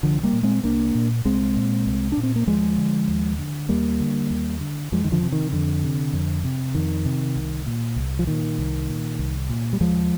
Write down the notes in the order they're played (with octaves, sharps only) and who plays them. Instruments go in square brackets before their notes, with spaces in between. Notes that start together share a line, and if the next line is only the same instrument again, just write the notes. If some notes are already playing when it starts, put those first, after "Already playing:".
[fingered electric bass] C2 D3 F3
G3 A#3
A#2
G#3 C4
C2 A#3 D4
A#2
C2 G#3 C4
A#2
C2
D4
A#2
C4
A#3
D#2 F3 G#3
D3
D#2
D3
D#2 G3 A#3
D3
D#2
D3
F2 F3 G#3
D#3
D3 F3
C3
D#3
F2 D3
C3
F2
C3
F2 D#3
C3
C2
A#2
C2
F3
A#2 D#3
C2
A#2
C2
A#2
G3
D#2 F3 G#3